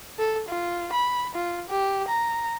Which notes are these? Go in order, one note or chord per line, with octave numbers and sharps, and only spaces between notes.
A4
F4
B5
F4
G4
A#5